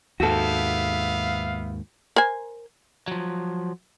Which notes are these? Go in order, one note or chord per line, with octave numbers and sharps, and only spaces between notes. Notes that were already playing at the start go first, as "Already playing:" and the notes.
D#2 G#2 B3 F#4 A4 E5 F5
A#4 C5 G#5
F3 F#3